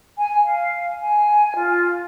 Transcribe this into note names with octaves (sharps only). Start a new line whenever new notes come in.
G#5
F5
G#5
F4